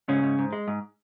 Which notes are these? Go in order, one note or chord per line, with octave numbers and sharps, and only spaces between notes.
G#2 C#3 C#4
G#2
G#2
G#3
G#2